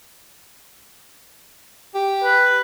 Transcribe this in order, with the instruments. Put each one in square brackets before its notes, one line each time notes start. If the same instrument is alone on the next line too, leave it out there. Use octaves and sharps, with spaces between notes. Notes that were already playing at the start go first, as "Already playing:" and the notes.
[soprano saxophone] G4
[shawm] B4